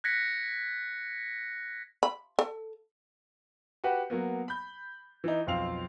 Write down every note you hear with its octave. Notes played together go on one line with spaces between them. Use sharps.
F#6 G#6 A#6 B6 C#7
B5
A4
F#4 G4 B4 F#5
F#3 A#3 B3
B5 G6
E3 D#4
B1 F2 C4 F5 F7